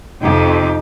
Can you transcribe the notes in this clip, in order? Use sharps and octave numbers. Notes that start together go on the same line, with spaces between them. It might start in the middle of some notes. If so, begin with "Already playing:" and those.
F2 C3 D#4 G4